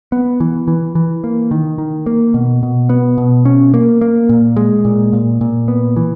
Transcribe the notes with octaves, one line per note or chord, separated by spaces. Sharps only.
B3
E3
E3
E3
A#3
D#3
D#3
A#3
B2
B2
B3
B2
C#4
A#3
A#3
A#2
G#3
A#2
A#2
A#2
B3
E3